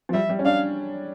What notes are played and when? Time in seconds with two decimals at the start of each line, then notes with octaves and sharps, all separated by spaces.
0.09 F3
0.13 G3 E5
0.29 G3
0.39 C#4
0.45 D4 F5